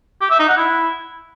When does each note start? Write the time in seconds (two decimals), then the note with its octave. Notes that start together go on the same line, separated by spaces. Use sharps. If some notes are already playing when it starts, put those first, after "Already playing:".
0.21 G4
0.30 E5
0.39 D#4
0.48 F#5
0.57 E4